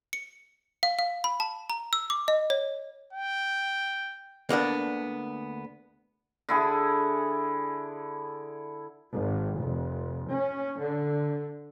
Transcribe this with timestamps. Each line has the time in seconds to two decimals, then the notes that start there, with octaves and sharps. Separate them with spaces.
0.13 C#7
0.83 F5
0.99 F5
1.24 B5
1.40 A5
1.70 A#5
1.93 E6
2.10 D6
2.28 D#5
2.50 C#5
3.13 G5
4.49 D2 A#3 B3 D4
6.49 D3 E4 G#4
9.14 G#1
9.61 F1
10.31 C#4
10.82 D3